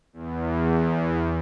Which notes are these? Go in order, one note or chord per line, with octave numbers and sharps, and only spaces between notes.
E2